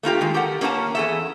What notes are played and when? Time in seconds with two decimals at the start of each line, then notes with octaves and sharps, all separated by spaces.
0.03 A3 A#3 F4 G4
0.21 D#3 G#3
0.34 G4 A4 A#4 F#5
0.61 A#3 C#4 D4 A4 F#5 A5
0.95 E2 G#4 A4 E5